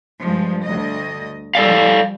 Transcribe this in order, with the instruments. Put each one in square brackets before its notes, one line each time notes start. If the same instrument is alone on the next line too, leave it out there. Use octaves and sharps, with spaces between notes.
[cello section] G2 F3 G#3
D2 D#5
[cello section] F3 G3 [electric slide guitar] A4 D5 F5